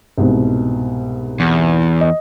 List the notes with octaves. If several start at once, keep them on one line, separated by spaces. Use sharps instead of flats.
C2 G#2 B2
E2
D#5